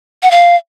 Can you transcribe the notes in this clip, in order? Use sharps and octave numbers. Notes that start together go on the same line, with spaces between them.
F#5
F5